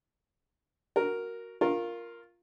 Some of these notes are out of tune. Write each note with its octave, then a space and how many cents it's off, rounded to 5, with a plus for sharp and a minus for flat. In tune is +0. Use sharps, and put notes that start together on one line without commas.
F#4 +0 A#4 +0
F4 +0 A#4 +0 C#6 -40